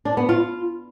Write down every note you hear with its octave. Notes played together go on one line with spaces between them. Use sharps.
D4
B3
F4